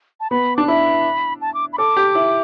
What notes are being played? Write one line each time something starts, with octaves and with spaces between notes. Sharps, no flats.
A5
B3 B5
D4 D6
E4 B5
A5
D6
B5
A4 D6
G4
E4